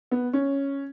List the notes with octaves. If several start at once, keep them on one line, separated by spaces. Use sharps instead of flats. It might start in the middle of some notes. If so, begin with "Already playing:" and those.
B3
C#4